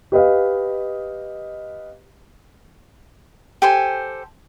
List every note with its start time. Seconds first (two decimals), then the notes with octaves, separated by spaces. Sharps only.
0.12 G4 B4 D#5 F5
3.62 G4 A4 C5 G#5